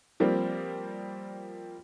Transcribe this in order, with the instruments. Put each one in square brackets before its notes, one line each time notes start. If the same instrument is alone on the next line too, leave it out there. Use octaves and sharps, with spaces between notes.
[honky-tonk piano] F3 G3 A#3 C4